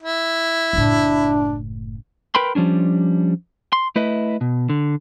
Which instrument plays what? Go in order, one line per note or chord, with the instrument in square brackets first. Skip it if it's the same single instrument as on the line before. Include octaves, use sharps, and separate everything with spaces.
[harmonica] E4
[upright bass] F#1 A2 [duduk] D4
[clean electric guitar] A#4 B4 G5 B5 C6
F3 G3 C#4 D4
C6
A3 E4 B4 D#5
B2
D3